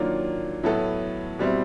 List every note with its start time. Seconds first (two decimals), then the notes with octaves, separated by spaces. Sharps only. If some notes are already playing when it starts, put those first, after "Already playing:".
Already playing: D#3 F#3 A#3 D4 F4
0.63 A2 F#3 B3 E4 A4
1.39 B2 G3 C4 E4